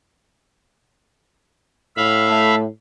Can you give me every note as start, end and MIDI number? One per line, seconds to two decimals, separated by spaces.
1.96 2.67 45
1.96 2.55 76
1.96 2.55 77
1.96 2.55 83
2.28 2.62 57